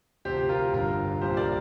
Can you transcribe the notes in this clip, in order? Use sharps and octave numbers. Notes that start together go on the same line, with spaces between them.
D2 C3 F3 G4 C5
F4 A#4
G1 G2 D3 F4 A#4
C2 A#2 F3 G4 C5
A#4 D5